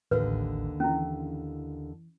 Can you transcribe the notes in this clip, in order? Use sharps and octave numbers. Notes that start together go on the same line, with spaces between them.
A1 D#2 D3 B4
E3 C#4 E4